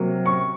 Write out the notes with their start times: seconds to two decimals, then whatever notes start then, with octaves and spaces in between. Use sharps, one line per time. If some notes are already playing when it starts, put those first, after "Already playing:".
Already playing: C3 F#3 A#3
0.26 C#6